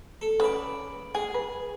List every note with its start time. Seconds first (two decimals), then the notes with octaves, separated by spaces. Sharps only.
0.21 A4
0.40 C#3 B4 D5
1.15 G#4 G#5
1.34 B4